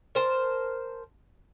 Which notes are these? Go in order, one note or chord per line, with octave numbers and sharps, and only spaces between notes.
A#4 C5 A5